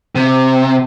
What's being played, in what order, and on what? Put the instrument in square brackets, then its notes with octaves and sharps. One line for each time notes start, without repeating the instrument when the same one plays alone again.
[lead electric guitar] C3